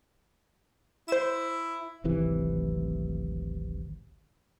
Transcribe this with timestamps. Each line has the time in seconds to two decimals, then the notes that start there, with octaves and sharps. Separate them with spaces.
1.08 E4 C5 E7
2.04 D1 G#1 C3 E3